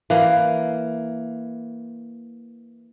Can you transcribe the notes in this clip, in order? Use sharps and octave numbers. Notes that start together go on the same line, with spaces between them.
E3 A#3